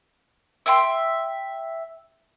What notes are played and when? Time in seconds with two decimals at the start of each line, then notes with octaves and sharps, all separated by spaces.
0.66 E5 G5 C6